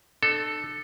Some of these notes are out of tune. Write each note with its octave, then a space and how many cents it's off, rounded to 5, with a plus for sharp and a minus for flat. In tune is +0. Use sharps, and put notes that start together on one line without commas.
D4 +45 A4 +0